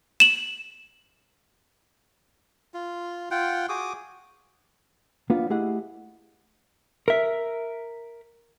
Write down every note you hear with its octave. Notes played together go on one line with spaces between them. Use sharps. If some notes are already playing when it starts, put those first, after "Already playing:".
E7 F#7
F4
F4 F#5 G5
F#4 G#4 D6 D#6
A#3 B3 D4 F4
A3 E4 G4 G#4 D#5 F#5
A#4 E5